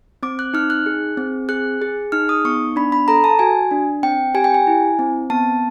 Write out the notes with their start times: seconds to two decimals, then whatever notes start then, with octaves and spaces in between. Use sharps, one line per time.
0.23 C4 D6
0.39 F#6
0.54 D#4 F6
0.70 F#6
0.86 G#4
1.17 C4
1.49 G#4 F#6
1.82 G#4
2.12 D#4 F6
2.29 D#6
2.45 B3 C#6
2.76 D4 B5
2.92 B5
3.08 A4 A#5
3.24 A5
3.39 F#4 G#5
3.71 D4
4.03 C4 G5
4.34 G4 G#5
4.44 G5
4.54 G#5
4.67 E4
4.99 C4
5.30 B3 A5